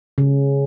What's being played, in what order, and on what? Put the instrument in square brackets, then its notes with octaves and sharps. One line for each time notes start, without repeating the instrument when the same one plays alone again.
[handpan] C#3